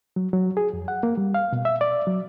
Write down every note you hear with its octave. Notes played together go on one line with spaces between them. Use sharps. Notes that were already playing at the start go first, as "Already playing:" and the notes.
F#3
F#3
G#4
F2
F#5
A#3
G3
F5
B2
E5
D5
F#3